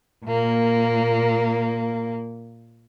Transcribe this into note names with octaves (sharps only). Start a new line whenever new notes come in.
A#2 A#3